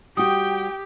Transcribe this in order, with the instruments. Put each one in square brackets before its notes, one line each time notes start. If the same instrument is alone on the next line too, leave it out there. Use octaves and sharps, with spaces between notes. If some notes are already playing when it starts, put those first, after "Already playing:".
[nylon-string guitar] G3 F#4 [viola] G4 [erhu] G5 [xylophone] D#6